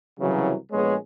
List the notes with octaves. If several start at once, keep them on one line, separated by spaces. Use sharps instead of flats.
C2 C#3 E3 F#3
A#1 G#3 B3 G#4 C#5